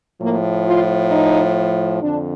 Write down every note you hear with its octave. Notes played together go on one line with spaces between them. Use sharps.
A2 F3 A#3
F4
D#4
F2 D3 D4